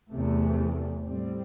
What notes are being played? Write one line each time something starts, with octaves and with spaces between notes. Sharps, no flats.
E2 C3 A3
A2 G3 C4